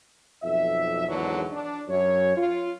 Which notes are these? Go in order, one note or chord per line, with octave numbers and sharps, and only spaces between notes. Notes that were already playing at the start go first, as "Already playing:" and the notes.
B1 F2 E5
G#1 E2 B2 D3 F#3
D4
F#2 C#5
F4